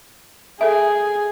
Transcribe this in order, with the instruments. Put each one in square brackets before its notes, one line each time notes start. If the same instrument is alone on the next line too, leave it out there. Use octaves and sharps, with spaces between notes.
[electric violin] G#4 [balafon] A4 E5